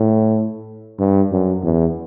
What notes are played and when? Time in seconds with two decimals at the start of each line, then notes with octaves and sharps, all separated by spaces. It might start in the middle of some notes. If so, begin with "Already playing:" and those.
Already playing: A2
0.99 G2
1.32 F#2
1.64 E2